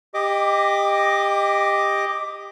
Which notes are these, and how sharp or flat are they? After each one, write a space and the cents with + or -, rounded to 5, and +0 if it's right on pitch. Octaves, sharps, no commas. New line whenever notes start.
G4 +20 D#5 +0 D6 +0